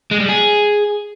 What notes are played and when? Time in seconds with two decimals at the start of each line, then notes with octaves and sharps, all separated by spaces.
0.11 G#3
0.20 G3
0.29 G#4